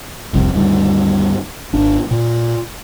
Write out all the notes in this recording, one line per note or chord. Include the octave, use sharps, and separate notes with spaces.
F1 C2 F2
D2 G2 D#3
G#1 D4
A#2